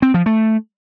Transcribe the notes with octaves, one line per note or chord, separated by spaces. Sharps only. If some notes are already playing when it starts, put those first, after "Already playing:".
C4
F3
A3